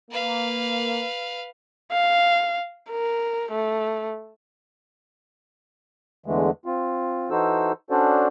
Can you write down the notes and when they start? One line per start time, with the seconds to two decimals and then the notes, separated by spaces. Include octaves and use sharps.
0.11 A#3 B4 F5
1.92 F5
2.91 A#4
3.51 A3
6.26 E2 D3 E3 G#3 A3
6.66 C4 F4
7.31 E3 D#4 F#4 A4 C5 E6
7.90 C#4 D4 F#4 A4 C5 D5